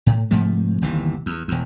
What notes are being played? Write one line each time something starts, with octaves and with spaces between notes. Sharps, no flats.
A2
G#2 C3 F3 A3
G1 D#2 C3 E3
E2
E1 E2